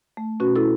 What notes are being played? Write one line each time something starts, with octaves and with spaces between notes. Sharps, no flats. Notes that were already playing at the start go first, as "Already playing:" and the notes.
A3
B2 C#4 F#4
E4 A4